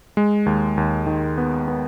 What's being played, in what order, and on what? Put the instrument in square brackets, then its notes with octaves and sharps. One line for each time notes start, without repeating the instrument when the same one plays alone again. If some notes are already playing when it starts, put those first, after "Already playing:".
[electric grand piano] G#3
D#2
D#2
D#3
B3
B3